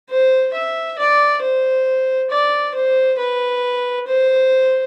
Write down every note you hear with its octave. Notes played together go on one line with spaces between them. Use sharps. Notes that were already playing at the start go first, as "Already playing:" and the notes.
C5
E5
D5
C5
D5
C5
B4
C5